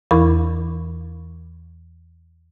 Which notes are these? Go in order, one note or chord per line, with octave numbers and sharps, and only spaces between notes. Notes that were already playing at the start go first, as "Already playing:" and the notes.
E2 E3 E4 A#4 B5 C#6